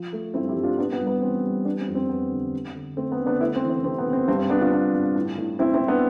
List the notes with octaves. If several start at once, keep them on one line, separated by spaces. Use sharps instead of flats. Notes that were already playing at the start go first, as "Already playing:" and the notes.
Already playing: F3
A3
G2 C4 E4
E4 G4
G2
D4 F4
A2 B3 D4
B3
G3
B3
E3 C4
G3
B3 D4
C4
F2
C4
F2 B3
D3
D3
D3
A3 C4
B3
D3
B3 D4
A3 C4 E4
C4
E3
C4
C3 C4
B3
C3
C4
G2 C4
C4
B3 D4
D4 F4
B3
G2
A2
A2
A2 C4 E4
C4 E4
A2
B3 D4